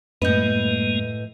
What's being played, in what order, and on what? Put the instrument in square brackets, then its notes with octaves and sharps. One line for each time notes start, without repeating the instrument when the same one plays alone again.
[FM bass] F#2 [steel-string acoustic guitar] A2 E4 [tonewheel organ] G#3 A#3 [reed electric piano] B4 D#5 G6